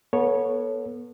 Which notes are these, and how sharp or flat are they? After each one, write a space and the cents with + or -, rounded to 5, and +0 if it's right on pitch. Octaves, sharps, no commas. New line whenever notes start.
B3 -30 A4 +0 C#5 +0